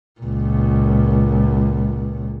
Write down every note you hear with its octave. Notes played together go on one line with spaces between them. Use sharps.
C#2 A#2